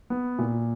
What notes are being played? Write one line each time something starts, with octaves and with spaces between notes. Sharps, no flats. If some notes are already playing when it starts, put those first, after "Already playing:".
B3
A#2